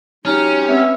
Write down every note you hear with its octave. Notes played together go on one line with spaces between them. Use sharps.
F#3 G#3 C#4 D#4 G4 F6
B3 C4 E5